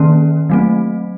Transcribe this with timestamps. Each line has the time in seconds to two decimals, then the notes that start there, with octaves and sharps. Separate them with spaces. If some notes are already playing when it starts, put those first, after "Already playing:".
Already playing: D#3 A#3 C#4
0.50 F#3 A3 C4